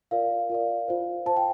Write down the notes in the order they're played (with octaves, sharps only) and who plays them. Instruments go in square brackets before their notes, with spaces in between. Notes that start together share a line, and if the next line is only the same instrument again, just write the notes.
[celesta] F4 A#4 D5 F5
F4 A#4 D5
F4 C5
F4 C5 A5
G5